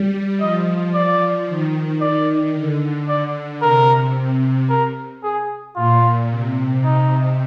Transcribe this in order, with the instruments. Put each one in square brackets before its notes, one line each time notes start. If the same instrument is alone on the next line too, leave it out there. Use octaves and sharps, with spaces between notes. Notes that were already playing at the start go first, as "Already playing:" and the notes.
Already playing: [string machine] G3
[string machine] F3 [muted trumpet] D#5
[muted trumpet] D5
[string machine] D#3
[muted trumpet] D5
[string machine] D3
[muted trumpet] D5
[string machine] C3 [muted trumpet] A#4
[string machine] C3
[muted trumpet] A#4
G#4
[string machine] A#2 [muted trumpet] F4
[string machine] C3
[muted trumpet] D#4